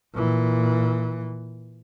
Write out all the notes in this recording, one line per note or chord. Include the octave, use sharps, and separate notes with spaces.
A#2 E3